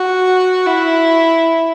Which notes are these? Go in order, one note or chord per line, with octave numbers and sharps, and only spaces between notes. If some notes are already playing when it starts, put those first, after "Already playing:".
Already playing: F#4
E4